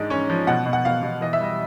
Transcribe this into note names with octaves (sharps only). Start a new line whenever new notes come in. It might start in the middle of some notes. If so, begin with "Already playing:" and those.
Already playing: G#2 G#3 D4 D5
C#4 C#5
F3
B2 F#5
B2
F#5
B2 F5
B2
E3 D#5
E5
G3 D#5